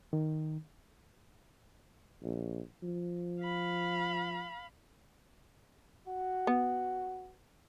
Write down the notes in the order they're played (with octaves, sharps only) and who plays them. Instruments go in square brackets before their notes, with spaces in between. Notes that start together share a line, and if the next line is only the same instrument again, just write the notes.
[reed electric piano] D#3
[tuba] A#1
F3
[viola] F5 B5
[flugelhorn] F#4
[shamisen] B3